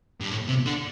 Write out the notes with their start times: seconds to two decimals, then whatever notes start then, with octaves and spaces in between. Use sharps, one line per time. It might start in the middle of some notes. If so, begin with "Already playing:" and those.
0.20 G2
0.30 A2
0.48 C3
0.66 D3